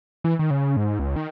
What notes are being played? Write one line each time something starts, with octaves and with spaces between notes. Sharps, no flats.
E3
D#3
C#3
G#2
C#2
D#3